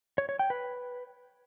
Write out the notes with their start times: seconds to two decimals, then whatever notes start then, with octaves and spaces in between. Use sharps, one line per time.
0.18 C#5
0.29 C#5
0.39 G5
0.50 B4